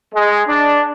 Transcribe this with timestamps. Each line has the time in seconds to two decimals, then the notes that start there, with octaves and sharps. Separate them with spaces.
0.14 G#3
0.47 D4